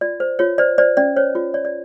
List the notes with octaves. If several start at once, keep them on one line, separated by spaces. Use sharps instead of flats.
F4 D5
C5
F4 C#5
C5 D5
C5 D5
C#4 D5
C5 C#5
F4
C#5 D5
D5